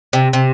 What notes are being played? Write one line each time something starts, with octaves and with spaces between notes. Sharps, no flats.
C3
C3